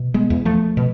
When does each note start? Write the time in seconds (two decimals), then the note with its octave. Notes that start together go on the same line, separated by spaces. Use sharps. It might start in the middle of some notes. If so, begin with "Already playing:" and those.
Already playing: B2
0.14 G#3 B3
0.30 E2
0.45 F3 A3
0.77 B2